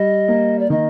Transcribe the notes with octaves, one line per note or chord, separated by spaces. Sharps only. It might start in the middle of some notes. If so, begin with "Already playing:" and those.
Already playing: G3 D#5
A#3
D5
D#3 D#5